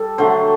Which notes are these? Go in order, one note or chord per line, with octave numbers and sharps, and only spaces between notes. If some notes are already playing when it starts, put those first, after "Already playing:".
Already playing: G3 A4
D3 F#3 A3 C5